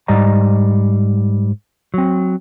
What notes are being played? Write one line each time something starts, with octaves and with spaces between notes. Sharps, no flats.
G#2 G3 D5 D#5 A#5
F#3 C4